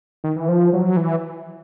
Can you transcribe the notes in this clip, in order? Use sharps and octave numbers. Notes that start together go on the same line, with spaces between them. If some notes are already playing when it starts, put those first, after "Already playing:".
D#3
E3
F3
F#3
E3